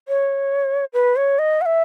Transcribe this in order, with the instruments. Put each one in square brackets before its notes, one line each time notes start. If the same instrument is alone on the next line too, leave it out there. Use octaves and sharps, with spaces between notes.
[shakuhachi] C#5
B4
C#5
D#5
F#5
E5